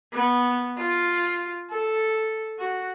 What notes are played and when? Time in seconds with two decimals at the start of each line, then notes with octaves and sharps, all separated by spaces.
0.13 B3
0.78 F4
1.71 A4
2.59 F#4